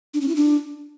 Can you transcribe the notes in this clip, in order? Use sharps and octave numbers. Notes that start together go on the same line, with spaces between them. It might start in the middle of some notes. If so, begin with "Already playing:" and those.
D4
C#4
E4
D4